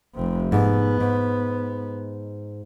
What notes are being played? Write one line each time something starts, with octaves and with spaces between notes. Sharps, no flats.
F1 C3
G#2 B3
G#2